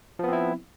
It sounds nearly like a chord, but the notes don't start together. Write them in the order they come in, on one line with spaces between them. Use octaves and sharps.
F3 B3 C4 E4